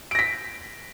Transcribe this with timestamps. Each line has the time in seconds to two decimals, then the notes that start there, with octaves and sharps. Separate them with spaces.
0.11 D7
0.15 A#6
0.19 B6